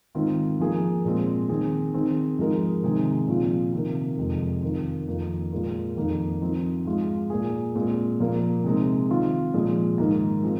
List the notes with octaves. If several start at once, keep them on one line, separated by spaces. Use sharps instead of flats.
G#2 D#3 C4 F4
F3 A#3 G#4
A#2 G#3 C4
D#3 C4 G#4
D#3 C4 G#4
G#2 F3 G#3 D#4 A#4
C3 D#3 G#3 C4 G#4
A#2 F3 C4 F4 G#4
C3 D#3 C4 F4 A#4
F2 C3 G#3
D#3 C4 F4 A#4
F2 D#3 A#3 F4 A#4
A#2 G#3 F4 A#4
F2 D#3 A#3 D#4
F3 C4 D#4
G#2 G#3 F4
A#2 A#3 G#4
A#2 G#3 C4
A#2 F3 A#3
C3 G#3 C4 D#4
D#3 C4 F4
A#2 F3 G#3
G#2 D#3 A#3 D#4
F3 C4 D#4 G#4